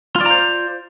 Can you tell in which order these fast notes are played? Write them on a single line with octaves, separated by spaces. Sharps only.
F4 D5 A#5 C5